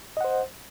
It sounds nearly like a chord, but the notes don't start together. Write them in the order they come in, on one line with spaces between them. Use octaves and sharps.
D#5 F#5 C5